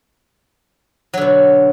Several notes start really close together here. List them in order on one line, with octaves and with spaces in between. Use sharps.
F#3 D3 B2